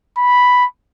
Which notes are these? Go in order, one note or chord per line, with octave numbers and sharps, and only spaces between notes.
B5